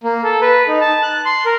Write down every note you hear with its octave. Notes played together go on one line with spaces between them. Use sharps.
A#3
A4
B4
D#4
A5
F#6
C6
A#4